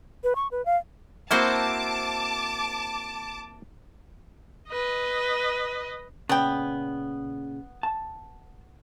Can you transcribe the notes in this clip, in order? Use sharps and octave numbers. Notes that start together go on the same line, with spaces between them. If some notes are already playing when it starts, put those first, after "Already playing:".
B4
C#6
B4
F5
A#3 C4 E4 F#4 C5 A5 D6
B4 D#5
A#2 C#3 B3 G5
A5